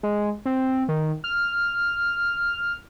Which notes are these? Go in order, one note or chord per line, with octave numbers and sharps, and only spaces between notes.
G#3
C4
D#3
F6